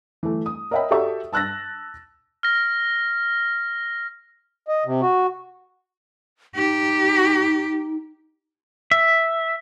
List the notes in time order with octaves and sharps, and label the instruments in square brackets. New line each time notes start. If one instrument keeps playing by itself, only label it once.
[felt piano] E3 A3
D#6
A#4 C#5 D#5 E5 G5 B5
F#4 G4 A4 D5 E5 C#6
A5 E6 F#6 A6 A#6
[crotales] F6 A#6
[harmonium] D#5
C3
F#4
[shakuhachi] D#4 [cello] G4
[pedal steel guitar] E5